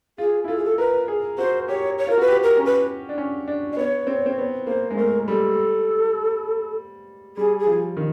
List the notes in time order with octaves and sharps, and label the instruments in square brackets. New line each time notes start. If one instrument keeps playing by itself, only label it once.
[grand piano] F4 [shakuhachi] G#4
[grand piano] E4
[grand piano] F4 [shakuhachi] A4
[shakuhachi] G#4
A4
[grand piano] A#4 [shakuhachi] B4
[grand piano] G#4
[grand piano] F#4 [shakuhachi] C5
[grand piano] G4 [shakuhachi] C#5
[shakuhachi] C#5
[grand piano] F4 [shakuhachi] A#4
[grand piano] F#4 [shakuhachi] B4
[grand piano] G4
[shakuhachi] A#4
[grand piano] C#4
[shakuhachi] B4
[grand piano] D4
C#4
D4
[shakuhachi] D5
[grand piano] B3 [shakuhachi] C#5
[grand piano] C4
C4
B3
[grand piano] A#3 [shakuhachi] C5
[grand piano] G#3
[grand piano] A3 [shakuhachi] A#4
[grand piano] G3 [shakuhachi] A4
[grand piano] G3 [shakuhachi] G#4
[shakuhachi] G#4
[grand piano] F3
D#3